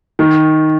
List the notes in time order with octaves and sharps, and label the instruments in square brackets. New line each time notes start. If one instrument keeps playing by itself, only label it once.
[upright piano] D#3